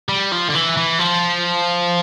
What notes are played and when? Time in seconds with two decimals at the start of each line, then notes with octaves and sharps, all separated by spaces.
0.09 G3
0.32 F3
0.49 D3
0.54 E3
0.77 E3
0.99 F3